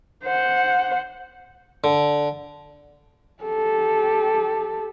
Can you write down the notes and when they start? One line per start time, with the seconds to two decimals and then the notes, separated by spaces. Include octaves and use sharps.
0.25 C5 F#5
1.84 D3
3.43 G4 A4